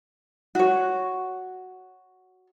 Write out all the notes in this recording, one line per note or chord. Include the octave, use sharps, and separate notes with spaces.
F#4 C#5